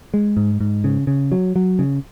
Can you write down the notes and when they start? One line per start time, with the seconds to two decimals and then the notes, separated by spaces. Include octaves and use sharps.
0.14 G#3
0.37 G#2
0.60 G#2
0.84 C#3
1.07 C#3
1.32 F#3
1.56 F#3
1.79 C#3